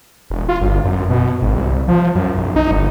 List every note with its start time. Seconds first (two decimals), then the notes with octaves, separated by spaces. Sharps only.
0.30 E1
0.49 F4
0.61 G1
0.85 F#2
1.10 B2
1.42 G#1
1.56 C2
1.88 F3
2.15 F#2
2.37 B1
2.56 D#4
2.71 G1